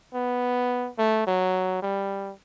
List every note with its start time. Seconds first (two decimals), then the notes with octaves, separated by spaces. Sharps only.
0.14 B3
0.98 A3
1.26 F#3
1.82 G3